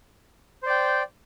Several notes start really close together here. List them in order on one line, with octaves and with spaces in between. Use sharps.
C5 D5 G5